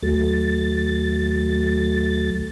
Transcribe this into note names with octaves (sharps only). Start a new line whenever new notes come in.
D#2 F#3 A3 A6